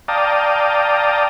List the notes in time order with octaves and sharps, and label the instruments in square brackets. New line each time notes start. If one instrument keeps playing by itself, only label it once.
[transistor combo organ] D5 F5 G5 A5 A#5 D#6